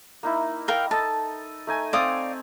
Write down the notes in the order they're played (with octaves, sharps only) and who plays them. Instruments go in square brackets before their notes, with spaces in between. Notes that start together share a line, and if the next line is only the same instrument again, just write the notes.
[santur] A#3 D#4 E4
[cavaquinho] A#4 F5 G5
[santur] A4 D#5 [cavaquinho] A5
[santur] A3 D#4 G#5
[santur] C4 [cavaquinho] D5 F5 D#6